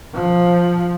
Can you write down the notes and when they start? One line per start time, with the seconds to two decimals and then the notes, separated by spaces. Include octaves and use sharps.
0.14 F3